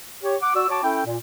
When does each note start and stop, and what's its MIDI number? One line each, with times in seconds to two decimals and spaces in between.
0.23 0.36 67
0.23 0.36 73
0.42 0.52 78
0.42 0.52 86
0.55 0.67 66
0.55 0.67 74
0.55 0.67 88
0.69 0.83 66
0.69 0.83 73
0.69 0.83 81
0.69 0.83 86
0.84 1.02 61
0.84 1.02 64
0.84 1.02 69
0.84 1.02 79
1.06 1.17 46